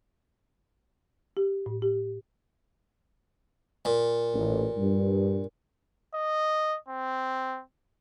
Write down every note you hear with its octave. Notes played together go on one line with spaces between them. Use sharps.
G4
A2
G4
A#2
A1
G2
D#5
C4